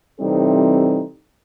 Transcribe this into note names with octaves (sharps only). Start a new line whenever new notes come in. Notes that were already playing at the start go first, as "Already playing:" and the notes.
C3 E3 G3 C4 D#4 A4